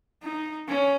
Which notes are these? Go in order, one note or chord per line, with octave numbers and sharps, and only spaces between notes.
D#4
C#4